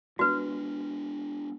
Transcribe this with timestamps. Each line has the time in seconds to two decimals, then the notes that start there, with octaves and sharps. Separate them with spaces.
0.19 G#3 B3 D4 F#4 B4